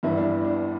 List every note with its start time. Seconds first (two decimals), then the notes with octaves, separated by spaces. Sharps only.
0.03 G1 G2 E3 G3 E4
0.17 D4
0.45 D4